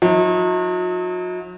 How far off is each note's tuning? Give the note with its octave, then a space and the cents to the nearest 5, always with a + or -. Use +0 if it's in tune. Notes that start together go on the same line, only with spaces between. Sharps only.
F#3 -40 D#4 +45